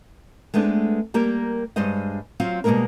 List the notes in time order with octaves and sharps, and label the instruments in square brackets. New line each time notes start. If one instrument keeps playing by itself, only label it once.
[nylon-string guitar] G#3 A3 B3 C4 D4
G3 A#3 G4 A#4
G2 G3 G#3 C5 D#5
F#3 C4 F4 F5
B2 G3 G#3 A#3 D4 A#4